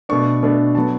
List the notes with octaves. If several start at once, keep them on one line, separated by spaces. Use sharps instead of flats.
B2 A3 D4 C#6
B2 A3 D4
F#3 B3 A5